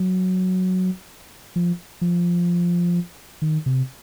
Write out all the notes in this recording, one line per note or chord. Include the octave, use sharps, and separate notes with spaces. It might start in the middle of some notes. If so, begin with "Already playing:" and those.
Already playing: F#3
F3
F3
D#3
C3